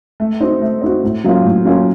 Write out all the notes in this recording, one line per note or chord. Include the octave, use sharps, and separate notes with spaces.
A3
C4 D#4 F#4
A3
C4 D#4 F#4
A2
F#3 A#3 C#4 F4
A2
F#3 A#3 C#4 F4